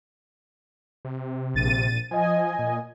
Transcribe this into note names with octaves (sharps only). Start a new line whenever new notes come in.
C3
A#1 A6 D#7
F3 D#5 G#5
A#2